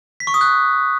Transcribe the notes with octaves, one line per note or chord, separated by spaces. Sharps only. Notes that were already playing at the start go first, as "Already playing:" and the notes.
B6
C#6
D#6
F#6